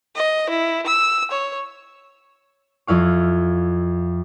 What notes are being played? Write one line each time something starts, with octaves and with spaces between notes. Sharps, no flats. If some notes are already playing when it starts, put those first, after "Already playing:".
D#5
E4
E6
C#5
F2 E4 F5 C#6